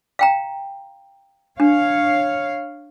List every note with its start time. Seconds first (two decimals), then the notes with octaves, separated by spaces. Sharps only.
0.19 F5 G5 A#5
1.60 D4 C#5 F5